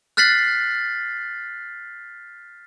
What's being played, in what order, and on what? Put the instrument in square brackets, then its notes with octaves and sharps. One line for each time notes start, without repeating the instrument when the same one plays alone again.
[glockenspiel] F6 F#6 A6 B6 C7 F#7